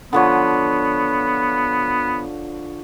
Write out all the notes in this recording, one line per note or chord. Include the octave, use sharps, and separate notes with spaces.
D3 F3 B3 C#5